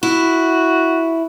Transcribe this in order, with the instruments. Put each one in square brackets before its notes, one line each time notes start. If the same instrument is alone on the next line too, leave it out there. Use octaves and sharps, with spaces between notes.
[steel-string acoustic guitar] E4 [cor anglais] F#4